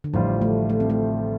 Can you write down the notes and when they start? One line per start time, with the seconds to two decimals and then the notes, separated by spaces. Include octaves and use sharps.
0.04 D3
0.14 A1 A2 F3 G3 F4 C5
0.41 A3
0.70 A3
0.80 C4
0.90 A3